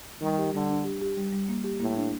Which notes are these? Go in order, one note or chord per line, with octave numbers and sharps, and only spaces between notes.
D#3 G3
G4
D3 G3
D4
G4
G4
G3
G3
A#3
G4
A2 A#3
D4